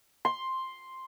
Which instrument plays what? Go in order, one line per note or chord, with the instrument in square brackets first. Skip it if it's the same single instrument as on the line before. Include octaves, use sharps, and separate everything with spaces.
[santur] C6